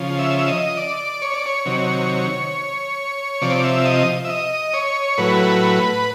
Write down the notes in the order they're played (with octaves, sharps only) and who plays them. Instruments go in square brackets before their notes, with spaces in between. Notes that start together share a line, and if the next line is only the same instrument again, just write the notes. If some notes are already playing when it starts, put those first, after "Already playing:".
Already playing: [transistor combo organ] C#3 F3
E5
D#5
D5
C#5
D5
C#5
C3 D#3 F#3
C3 F3 D5
E5
D#5
E5
D#5
C#5
A2 F#3 B4